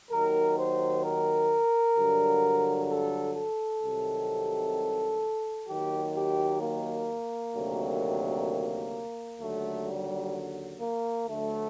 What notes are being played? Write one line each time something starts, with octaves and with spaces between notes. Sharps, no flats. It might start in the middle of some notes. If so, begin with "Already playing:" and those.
D#2 D#3 F#3 A#4
C5
A#4
G2 D3 F#3
A4
A4
C2 C3 D#3 F#3
D#2 D#3 F#3 G4
G4
A#3
D2 C3 D#3 F#3
D#2 D3 F#3 A3
G3
A#3
D2 D3 F#3 A3